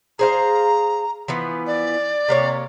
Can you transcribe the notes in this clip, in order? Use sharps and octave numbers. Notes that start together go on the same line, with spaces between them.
G#4 C5 F5 A#5
E3 F3 B3
D5
C3 A#3 C#5